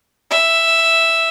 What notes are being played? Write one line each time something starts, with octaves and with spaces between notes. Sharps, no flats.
E5